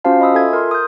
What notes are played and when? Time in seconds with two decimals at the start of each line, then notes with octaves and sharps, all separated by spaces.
0.04 C#4 F4 F#4 C5 F5 A5
0.20 D#5 B5 D#6 E6
0.34 F4 A4 E5 G#5 G#6
0.53 A#4 C6
0.71 D#6 G6